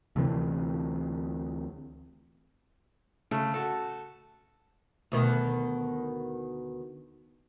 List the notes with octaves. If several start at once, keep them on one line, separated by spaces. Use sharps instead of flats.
D2 C3 E3 C4
C#3 A3
F#4 A4
D2 B2 D#3